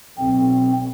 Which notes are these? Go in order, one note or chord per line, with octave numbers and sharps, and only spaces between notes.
B1 C4